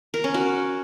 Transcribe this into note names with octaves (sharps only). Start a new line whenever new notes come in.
A#4
C#4
F#4